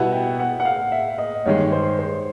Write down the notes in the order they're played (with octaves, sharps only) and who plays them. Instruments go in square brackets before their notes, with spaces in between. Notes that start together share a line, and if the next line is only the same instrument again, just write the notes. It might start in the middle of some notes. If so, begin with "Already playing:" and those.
Already playing: [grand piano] B2 G3 B3 E4 [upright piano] F#5
[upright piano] G5
F#5
F#5
F5
E5
D#5
[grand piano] G2 D#3 G#3 [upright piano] C#5
[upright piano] C5
C5